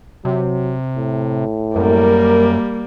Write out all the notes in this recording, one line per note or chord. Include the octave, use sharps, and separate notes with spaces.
C3 F#3
A2
F#2 G3 A#3 A#4